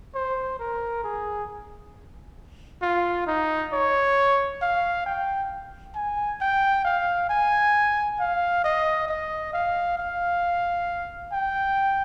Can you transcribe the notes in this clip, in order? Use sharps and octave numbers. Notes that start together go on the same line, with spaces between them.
C5
A#4
G#4
F4
D#4
C#5
F5
G5
G#5
G5
F5
G#5
F5
D#5
D#5
F5
F5
G5